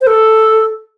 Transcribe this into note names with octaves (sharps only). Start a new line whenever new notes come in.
C5
A4